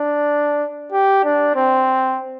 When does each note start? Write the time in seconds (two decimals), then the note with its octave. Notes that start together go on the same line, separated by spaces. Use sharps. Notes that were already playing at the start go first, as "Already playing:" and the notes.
Already playing: D4
0.92 G4
1.24 D4
1.55 C4